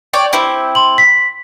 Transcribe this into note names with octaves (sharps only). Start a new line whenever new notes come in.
C#5 D5 G5
C4 E4 G4
C6 F#7
B6